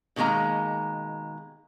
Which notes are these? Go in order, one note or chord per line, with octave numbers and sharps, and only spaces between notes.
B2 D#3 G#3 A#3 A#5